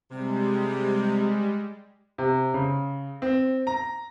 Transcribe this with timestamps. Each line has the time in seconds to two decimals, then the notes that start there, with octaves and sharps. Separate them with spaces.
0.11 C3 G3 G#3
2.18 C3
2.54 C#3
3.22 C4
3.67 A#5